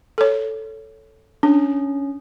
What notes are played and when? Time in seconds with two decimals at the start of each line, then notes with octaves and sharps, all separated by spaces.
0.18 A4 C#5
1.43 C#4 D4